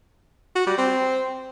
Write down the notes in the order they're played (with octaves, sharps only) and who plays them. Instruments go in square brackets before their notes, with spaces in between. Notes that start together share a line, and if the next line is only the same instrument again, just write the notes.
[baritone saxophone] F#4
G3
C4